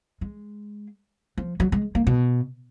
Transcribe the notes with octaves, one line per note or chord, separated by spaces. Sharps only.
G#3
F3
F#3
G#3
A#3
B2